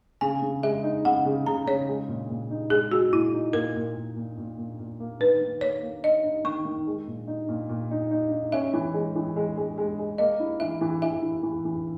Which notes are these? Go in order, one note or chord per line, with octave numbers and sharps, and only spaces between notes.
C#3 G#5
C#3
G#3 E5
D#4
C#3 F#5
C#3
C#3 A#5
C#3 C#5
G#3
A#2
A#2
D#4
G#3 G#4
G#3 F#4
A#2 E4
D#4
A#2 A#4
A#2
A#2
A#2
A#2
A#2
A#2
A#3
D#3 B4
D#3
A#3 C#5
A#3
D#4 D#5
D#4
D#3 C#6
D#3
G#3
A#2
D#4
A#2
A#2
D#4
D#4
D#4
C#4 E5
E3
G#3
E3
G#3
G#3
G#3
G#3
A#3 D#5
E4
E3 E5
E3
E3 E5
E4
E3
E3